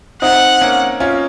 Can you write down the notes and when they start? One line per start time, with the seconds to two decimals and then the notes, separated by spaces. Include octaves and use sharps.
0.22 C4 D#4 F#5
0.61 A#3 C#4
1.00 C#4 F4